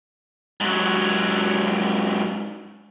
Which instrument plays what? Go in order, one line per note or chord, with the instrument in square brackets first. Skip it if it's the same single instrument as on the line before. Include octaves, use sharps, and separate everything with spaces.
[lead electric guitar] G#2 F#3